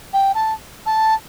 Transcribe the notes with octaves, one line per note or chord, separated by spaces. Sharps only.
G5
A5
A5